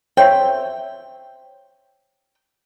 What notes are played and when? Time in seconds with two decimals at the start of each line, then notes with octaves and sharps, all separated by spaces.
0.17 C5 C#5 E5 G5